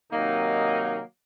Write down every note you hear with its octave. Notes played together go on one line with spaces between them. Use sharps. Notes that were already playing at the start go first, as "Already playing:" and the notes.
C3 D#3 F#3 A#3 D#4